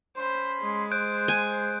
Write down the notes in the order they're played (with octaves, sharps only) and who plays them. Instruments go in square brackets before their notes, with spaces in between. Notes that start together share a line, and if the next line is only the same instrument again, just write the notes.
[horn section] C#4 B5 C6 [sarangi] C5
[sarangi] G#3
[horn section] C5 [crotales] F#6 G6 D7
[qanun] G#5